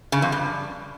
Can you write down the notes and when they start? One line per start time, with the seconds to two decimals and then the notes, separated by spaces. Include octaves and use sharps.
0.12 C#3
0.22 F2
0.32 G2